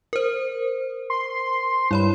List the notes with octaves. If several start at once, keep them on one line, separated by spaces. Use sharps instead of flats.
A#4 C5
C6
G2 E4 C#5 B5